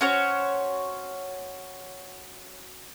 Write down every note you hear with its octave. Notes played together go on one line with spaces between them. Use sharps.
C#4 F#4 C5 C#5